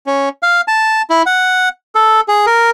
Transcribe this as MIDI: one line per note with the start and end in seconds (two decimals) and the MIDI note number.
0.07 0.29 61
0.43 0.61 77
0.68 1.02 81
1.10 1.22 64
1.26 1.69 78
1.95 2.21 69
2.28 2.46 68
2.46 2.70 70